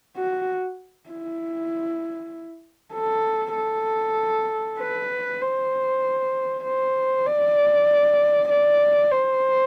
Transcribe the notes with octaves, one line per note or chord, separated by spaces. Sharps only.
F#4
E4
A4
A4
B4
C5
C5
D5
D5
C5